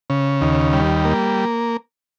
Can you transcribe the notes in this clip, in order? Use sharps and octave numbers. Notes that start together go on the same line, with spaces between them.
C#3
D#2
G3
A#3